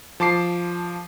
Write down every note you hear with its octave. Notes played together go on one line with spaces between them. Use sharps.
F3 A5 D6 C7